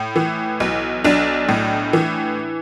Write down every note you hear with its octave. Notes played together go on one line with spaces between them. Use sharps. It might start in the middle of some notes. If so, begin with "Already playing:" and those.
Already playing: A2
E3
B1
B1 D4
A2
E3